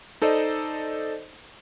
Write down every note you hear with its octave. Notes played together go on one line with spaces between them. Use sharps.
D#4 A4 C5 D5 D#5